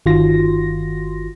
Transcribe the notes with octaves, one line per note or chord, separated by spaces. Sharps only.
G1 D#3 F4 F#4 C6 A#6